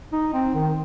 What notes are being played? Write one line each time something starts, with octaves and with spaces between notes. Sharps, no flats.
D#4
C4
D#3